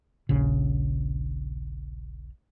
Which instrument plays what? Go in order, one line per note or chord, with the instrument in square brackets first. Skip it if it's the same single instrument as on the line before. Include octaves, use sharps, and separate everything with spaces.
[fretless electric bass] D#1 A#1 C#3